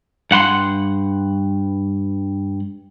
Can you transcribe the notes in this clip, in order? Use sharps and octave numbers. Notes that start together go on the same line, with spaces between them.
G2 F#5 B5 C6